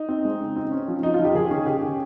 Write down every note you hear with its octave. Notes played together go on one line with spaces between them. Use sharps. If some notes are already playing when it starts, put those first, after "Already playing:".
Already playing: D#4
C4
G#3
C#3
C4
C#4
F3
F3 D#4
F4
F3
G4
D#3 G#4
C#4 G#4
D#3 G4
C#4